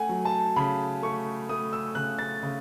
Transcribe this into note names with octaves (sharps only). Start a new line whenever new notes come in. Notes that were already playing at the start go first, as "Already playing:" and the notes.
Already playing: A3 F#5 G#5
F#3
A5
C#3 B5
A3 C#6
A3 D#6
E6
C#3 F#6
A6
C#3